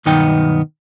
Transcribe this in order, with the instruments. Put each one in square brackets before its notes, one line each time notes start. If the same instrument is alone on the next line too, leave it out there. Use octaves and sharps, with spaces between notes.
[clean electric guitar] B1 G2 D#3 B3 D#4 G5